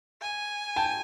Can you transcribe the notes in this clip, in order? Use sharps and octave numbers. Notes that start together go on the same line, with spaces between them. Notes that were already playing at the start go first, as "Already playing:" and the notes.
G#5
G5 A5